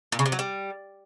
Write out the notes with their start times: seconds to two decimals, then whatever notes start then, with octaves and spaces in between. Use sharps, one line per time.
0.12 A#2
0.19 C#3
0.26 C3
0.32 F#3
0.39 G3